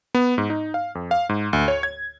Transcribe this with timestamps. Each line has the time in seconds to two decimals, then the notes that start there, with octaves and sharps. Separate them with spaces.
0.15 B3
0.38 G#2
0.50 D#4
0.74 F5
0.95 F2
1.11 F5
1.29 G#2
1.53 D2
1.68 C#5
1.83 G#6